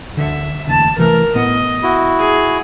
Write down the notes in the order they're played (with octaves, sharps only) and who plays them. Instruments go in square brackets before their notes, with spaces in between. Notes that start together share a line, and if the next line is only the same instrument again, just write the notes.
[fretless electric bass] D2 D3 [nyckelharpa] E5
[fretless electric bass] F1 D#2 C#3 [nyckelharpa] A5
[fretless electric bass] C3 E3 A3 [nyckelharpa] A#4
[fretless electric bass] A2 B3 [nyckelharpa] D#5
[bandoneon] E4 F#4
[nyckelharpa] G#4